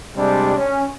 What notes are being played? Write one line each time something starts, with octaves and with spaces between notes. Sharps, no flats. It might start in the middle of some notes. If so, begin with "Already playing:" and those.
C3 G3 G#3 D4
C#4